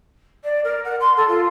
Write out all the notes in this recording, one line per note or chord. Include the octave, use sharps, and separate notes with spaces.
D5
A#4
F#5
C6
A4
F4